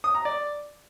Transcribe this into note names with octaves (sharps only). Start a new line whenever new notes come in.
D#6
A#5
D5